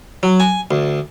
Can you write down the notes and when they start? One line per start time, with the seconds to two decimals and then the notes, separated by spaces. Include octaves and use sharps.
0.23 F#3
0.40 G#5
0.71 D2